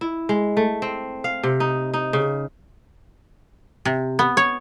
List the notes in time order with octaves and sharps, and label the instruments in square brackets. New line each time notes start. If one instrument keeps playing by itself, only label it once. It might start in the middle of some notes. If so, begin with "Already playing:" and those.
[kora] E4
G#3
A3
C4
F5
C3
D#4
D#4
C#3
[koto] C3
B3
C#5